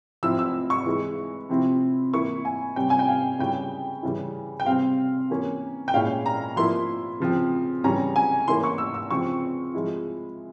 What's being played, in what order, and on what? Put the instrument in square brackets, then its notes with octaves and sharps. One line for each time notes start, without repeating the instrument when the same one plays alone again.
[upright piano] F3 C4 E4 E6
E6
C#6
E3 G#3 E4
C3 F3 C4 E4
E3 A#3 E4 C#6
G#5
C3 G3 C#4 G5
G#5
G5
F5
C#3 G3 C#4 E4 G5
C#3 E3 G3 C#4 E4
G5
C3 G3 C4 F5
E3 A#3 C#4
G5
A#2 G#3 C#4 E4 F5
A#5
F3 A#3 E4 C6
C#3 F3 C4
C#3 E3 G3 C#4 A#5
G#5
E3 A#3 C#4 E4 C6
C#6
E6
E6
C#3 F3 C4 C#6
F3 G#3 E4